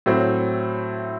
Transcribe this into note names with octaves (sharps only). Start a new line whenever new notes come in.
A2 F#3 C4